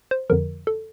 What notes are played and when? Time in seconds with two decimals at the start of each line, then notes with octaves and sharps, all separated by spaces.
0.11 C5
0.30 F2 D3 F3 A#4
0.67 A4